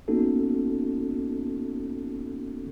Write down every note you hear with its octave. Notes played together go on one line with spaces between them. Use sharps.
A#3 B3 C#4 D#4 F#4 A4